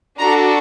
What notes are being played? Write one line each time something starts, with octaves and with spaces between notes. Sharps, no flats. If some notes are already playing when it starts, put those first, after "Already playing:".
D4 F#4 A4 A#5